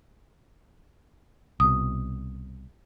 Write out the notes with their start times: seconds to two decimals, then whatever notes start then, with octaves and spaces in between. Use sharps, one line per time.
1.60 C2 B2 D#6